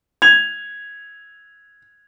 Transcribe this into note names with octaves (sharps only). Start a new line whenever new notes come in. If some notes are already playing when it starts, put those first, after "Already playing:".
G#6 F7